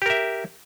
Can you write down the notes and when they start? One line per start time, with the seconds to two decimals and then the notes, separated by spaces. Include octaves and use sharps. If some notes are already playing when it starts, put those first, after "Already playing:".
0.02 G4
0.06 A#4
0.10 E5